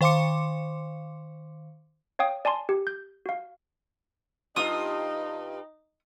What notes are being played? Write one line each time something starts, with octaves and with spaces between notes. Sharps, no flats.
D#3 C5 F5 C6 D6 C#7
C#5 F5 G5 D#6
D5 G#5 A5 C6
G4
G6
F#4 F5
G2 D#4 F4 D#6